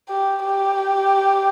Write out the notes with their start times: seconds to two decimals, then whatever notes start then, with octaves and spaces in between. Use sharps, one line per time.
0.09 G4
0.44 G4